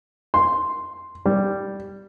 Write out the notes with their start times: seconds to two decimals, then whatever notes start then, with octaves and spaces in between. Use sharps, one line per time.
0.34 C6
1.26 G3